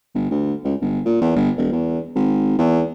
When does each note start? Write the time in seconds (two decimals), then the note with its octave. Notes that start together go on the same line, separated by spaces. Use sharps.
0.15 G1
0.31 D2
0.64 C#2
0.81 G1
1.06 A#2
1.21 E2
1.36 G1
1.57 E1
1.72 E2
2.15 G#1
2.58 E2